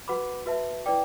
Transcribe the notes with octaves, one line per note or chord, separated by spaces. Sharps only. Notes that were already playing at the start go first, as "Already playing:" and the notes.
F#4 B4 F#5 B5 D6
F#4 B4 E5 A5
E4 B4 D5 G5 D6